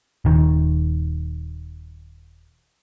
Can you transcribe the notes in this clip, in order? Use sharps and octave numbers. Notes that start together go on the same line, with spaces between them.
D#1 D#3